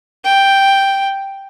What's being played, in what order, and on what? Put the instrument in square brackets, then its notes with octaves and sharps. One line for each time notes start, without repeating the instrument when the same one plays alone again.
[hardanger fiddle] G5